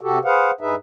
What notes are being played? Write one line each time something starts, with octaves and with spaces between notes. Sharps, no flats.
C3 F#4 G4 A4
G#4 B4 C5 F5 F#5
G2 D#4 G#4 B4 E5